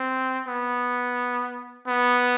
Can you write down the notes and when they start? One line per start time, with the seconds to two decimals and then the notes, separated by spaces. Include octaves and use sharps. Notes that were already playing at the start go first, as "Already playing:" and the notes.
Already playing: C4
0.48 B3
1.88 B3